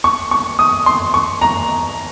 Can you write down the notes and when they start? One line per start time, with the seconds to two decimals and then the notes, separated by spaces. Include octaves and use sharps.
0.04 C#6
0.31 C#6
0.59 D#6
0.86 C6
1.14 C#6
1.41 A#5